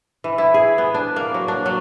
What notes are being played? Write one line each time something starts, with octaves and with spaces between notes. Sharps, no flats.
E3
E4
G#4
B3
D4
A#3
F#3
D4
F#3